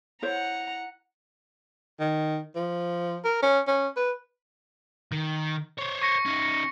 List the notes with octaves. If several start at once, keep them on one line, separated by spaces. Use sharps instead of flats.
E4 C5 C#5 F#5 A#5
D#3
F3
A#4
C#4
C#4
B4
D#3
C5 C#5
C#6 A#6 C#7
C#4 D#4